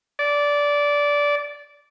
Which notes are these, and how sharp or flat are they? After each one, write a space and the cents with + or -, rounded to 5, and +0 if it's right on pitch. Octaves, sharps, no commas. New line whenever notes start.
D5 -15